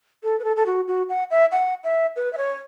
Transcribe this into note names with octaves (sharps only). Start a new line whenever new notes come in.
A4
B4
A4
A4
F#4
F#4
F#5
E5
F#5
E5
B4
E5
C#5